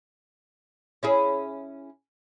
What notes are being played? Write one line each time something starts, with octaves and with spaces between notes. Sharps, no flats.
C#4 E4 G#4